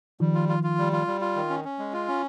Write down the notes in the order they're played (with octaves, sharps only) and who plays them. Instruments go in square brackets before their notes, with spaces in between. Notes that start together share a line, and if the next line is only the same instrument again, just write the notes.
[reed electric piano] D#3 F3 [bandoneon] G3
[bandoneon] F4
F4
F4
G3
F4
G3
F4
D#3
C#4
C#4
G#3
F4
C#4